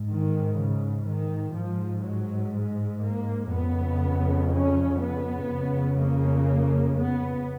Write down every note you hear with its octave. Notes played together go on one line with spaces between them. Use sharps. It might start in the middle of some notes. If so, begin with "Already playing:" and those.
Already playing: G#2
D#3
C#3
D#3
G#2 F3
F#3
G#3
A#3
F2 C#3 B3
C#4
B3
F2 C#3
A#3
B3